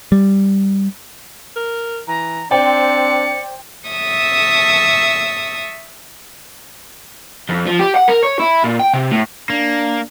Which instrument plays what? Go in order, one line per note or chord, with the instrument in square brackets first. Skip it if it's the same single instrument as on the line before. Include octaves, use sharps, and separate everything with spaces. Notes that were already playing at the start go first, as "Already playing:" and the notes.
[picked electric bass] G3
[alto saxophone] A#4
[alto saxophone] E3 [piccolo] A#5
[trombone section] C4 D4 [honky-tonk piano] C5 G5 [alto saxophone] D5 [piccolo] C#7
[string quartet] E5 A5 C#6 D#6 E6
[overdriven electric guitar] F2
F3
G4
F#5
A#4
C#5
E4
A#2
G5
C3
A2
[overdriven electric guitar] A#3 [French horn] D4